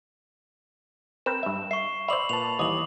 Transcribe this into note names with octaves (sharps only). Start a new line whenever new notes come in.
C4 A#4 B4 E7
G2 E5
E5 C#6 C7
C5 D5 E5 B5 F#7
A#2 B4 A5 F7
D#2 E3 G3 D6 D#6 F#7